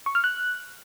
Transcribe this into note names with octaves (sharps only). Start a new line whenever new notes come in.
C#6
F6
F#6